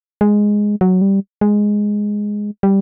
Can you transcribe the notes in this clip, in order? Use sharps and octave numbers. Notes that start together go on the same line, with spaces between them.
G#3
F#3
G3
G#3
G3